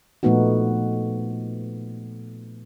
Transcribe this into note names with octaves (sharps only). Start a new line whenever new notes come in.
A#2 F3 A3 B3 D#4 F#4